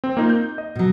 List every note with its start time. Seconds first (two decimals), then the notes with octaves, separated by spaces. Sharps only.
0.04 C4
0.17 A#3 D#4 F4
0.30 G6
0.58 D#5
0.75 B2 F#3